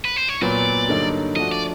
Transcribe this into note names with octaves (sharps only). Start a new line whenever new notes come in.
B4
C5
C#5
A#2 F#3 B3 D5
G2 D3 F#3 A#3 D#4
F3 A3 D4 F#4 D#5
D5